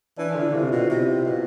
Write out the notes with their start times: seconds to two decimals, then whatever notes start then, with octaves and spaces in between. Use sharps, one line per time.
0.17 E3 D4
0.35 D3
0.41 E4
0.53 C3 F4
0.72 B2
0.90 C3
1.25 B2 F4